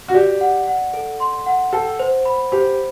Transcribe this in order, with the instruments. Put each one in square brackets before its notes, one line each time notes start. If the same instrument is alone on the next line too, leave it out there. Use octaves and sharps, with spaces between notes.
[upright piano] F#4
[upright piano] G4 [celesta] D5
[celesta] F#5
F#5
A4
C6
F#5
[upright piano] A4 [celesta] G5
[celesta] C5
B5
[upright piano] G4 [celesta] C5